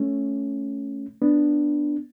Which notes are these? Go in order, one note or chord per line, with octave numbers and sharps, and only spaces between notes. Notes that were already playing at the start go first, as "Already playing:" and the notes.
Already playing: A3 C#4
B3 D4